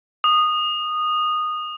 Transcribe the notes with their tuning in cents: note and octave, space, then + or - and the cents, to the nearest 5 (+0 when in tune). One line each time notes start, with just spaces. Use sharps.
D#6 -15